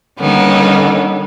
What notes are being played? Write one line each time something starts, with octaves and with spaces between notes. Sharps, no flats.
D3 D#3 G3 A#3 B3 C#4